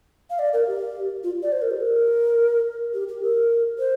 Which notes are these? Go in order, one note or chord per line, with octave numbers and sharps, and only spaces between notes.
F5
D5
A#4
G4
F4
D5
C5
A#4
G4
A#4
G4
G4
A#4
C5